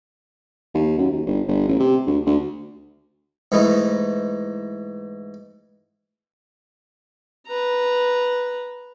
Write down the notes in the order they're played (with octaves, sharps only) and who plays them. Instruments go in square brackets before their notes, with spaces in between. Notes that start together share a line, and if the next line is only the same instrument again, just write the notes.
[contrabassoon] D#2
F#2
D#2
G1
G1
A1
C3
D2
D2
[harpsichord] G#2 E3 A3 D#4
[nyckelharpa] B4 A#5